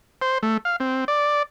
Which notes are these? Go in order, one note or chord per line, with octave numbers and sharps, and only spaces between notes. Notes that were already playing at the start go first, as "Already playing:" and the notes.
C5
A3
F5
C4
D5